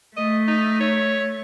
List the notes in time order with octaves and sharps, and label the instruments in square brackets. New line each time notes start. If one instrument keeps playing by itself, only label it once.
[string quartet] A3 [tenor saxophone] D#5
[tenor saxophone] D#4
C#5